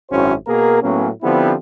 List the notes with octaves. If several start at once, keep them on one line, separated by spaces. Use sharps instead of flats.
G#1 F#2 C#4 E4 F#4 C5
B2 A#3 G#4 A#4
A2 F#3 A#3 B3 C#4
D3 F3 B3 C4 E4 G4